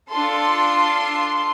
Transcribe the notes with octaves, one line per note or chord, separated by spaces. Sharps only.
D4 F4 A4 C6